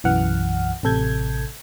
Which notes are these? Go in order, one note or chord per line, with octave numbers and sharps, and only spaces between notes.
B1 F#2 E3 F#5 F6
A1 C3 A4 G6 G#6